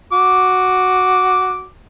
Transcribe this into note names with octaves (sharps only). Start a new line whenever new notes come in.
F#4 D6